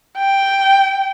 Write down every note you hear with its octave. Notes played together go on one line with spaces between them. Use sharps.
G5